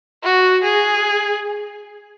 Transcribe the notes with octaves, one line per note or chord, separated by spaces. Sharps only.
F#4
G#4